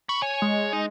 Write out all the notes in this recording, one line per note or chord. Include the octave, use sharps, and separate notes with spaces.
B5 C#6
C#5 G#5
G#3
D#4